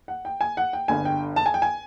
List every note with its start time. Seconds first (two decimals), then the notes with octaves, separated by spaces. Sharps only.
0.08 F#5
0.25 G5
0.41 G#5
0.57 F#5
0.73 G5
0.88 G1 G2 D3 G#5
1.05 G5
1.36 A5
1.46 G#5
1.54 G5
1.62 G#5